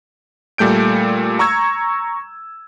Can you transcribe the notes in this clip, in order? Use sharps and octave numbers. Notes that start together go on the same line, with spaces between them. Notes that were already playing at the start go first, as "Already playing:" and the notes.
A#2 G3 A3 G6 D7
A#5 C#6 E6 G#6